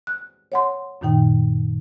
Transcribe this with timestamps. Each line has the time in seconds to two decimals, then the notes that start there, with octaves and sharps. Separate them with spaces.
0.07 F#6
0.52 C#5 F#5 C6
1.01 F#2 A#2 D#3 D#4 G5